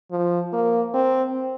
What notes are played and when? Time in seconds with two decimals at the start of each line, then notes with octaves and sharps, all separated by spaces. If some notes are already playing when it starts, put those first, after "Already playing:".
0.11 F3
0.53 A#3
0.94 C4